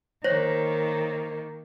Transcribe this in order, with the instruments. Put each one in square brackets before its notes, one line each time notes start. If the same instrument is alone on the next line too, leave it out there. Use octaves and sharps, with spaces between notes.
[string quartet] D#3 A#3 [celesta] C5 C#5 A#6